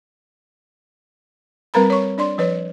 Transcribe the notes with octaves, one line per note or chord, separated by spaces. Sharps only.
G3 C4 A#4 B4 A#5 B5
C#5 C#6
D4 D5 C6
F3 B4 C#5